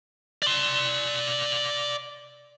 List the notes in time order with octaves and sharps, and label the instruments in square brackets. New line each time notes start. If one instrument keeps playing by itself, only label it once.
[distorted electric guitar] D5 C6